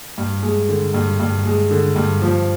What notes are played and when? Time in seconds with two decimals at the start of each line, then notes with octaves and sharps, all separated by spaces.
0.18 G2
0.43 G#3
0.69 D3
0.94 G2
1.20 G2
1.46 G#3
1.71 D3
1.96 G2
2.22 F3